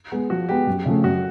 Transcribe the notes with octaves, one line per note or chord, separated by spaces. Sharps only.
G#3 B3
F3 F#4
G#3 B3 G4
F#2
C#3 F3 A3
F#2 F#4